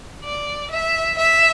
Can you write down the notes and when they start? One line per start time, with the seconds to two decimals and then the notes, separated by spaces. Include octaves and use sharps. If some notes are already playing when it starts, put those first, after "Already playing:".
0.24 D5
0.70 E5
1.18 E5